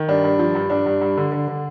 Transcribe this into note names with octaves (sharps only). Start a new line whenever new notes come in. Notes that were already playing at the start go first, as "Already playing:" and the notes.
Already playing: D#3
G2 D4
G2
F3
G2
G2 D4
G2
G2
D3
D3
D3